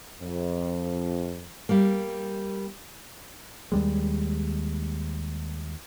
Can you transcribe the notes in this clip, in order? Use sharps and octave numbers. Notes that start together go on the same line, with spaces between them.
F2
G3 A#3
D#2 G3 G#3